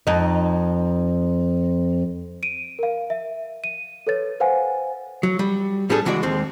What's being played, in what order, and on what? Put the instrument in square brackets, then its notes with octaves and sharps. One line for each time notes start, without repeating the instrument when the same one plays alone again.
[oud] F2 D#4
[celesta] D7 D#7
A#4 F5
E5
D#7
A4 B4 C#5 A6
B4 C5 F5 F#5 G#5
[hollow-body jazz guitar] F#3
G3
A2 G3 B3 D4 G#4 A4
C#2 E3 G#3 F#4 D5
D#2 G#3 C4